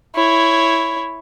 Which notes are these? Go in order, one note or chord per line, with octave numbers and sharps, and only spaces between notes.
E4 C#5